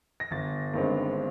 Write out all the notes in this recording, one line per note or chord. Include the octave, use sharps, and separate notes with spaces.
A#6
G1 A6
G2 D#3 G#3 C4